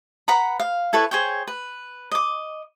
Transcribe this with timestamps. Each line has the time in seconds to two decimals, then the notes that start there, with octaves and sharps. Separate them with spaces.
0.28 B4 F#5 A#5 B5
0.60 F5
0.93 E4 A4 B4 C#5
1.11 G#4 C5 C#5 G5
1.47 B4
2.12 D#5 D6